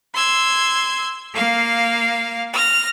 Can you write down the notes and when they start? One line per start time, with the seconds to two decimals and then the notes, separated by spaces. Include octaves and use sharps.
0.14 C6 E6 G#6
1.34 A#3 F5
2.53 F6 A#6